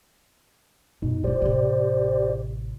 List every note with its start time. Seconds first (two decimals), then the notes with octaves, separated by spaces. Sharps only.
1.02 F#2 B2 D#4
1.24 F2 F4 G4 C5 D5
1.42 A1 C3